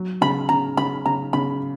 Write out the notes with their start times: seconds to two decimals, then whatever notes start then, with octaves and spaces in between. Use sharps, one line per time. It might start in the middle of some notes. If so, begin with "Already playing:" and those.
Already playing: F#3
0.21 C#3 B5
0.49 C#3 A#5
0.77 C#3 B5
1.06 C#3 A#5
1.33 C#3 B5